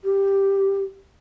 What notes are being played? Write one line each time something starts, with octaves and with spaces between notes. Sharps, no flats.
G4